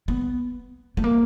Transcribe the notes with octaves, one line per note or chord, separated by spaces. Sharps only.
B3
A3
A#3